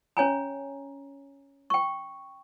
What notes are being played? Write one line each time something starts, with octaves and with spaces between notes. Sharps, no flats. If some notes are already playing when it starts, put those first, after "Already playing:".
C#4 C#5 G#5 A#5
G5 C#6